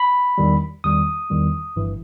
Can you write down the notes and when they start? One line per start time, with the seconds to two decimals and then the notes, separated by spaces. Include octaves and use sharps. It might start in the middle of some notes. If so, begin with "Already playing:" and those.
Already playing: B5
0.38 E2 D#3 G3
0.84 E2 D#3 G3 D#6
1.30 E2 D#3 G3
1.76 G1 G2 E3